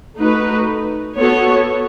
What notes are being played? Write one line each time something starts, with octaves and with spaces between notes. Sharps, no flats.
A3 D#4 F#4 B4
B3 F#4 A4 C#5